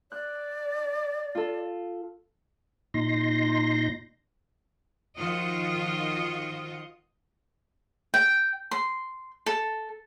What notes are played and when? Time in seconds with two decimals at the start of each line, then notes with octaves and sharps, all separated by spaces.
0.12 D5 F#6
1.35 F4 A4
2.94 A#2 D#4 C6 A#6
5.19 D#3 F3 F4 F#4 D#5
8.14 G5
8.71 C6
9.46 A4